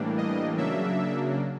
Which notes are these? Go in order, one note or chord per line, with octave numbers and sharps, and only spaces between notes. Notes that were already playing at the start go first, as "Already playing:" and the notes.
Already playing: A2 E3 G3 A#3 D4
D#5
C#3 F#3 A#3 D4 E5